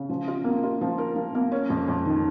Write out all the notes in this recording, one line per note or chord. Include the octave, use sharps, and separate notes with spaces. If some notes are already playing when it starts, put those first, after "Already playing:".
Already playing: C#3
F3
F4
A#3
F4
F3
A#4
F3
A#3
C#4
F2
F2
D#3